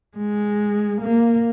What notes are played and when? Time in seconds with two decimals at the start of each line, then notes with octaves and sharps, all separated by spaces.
0.17 G#3
1.02 A#3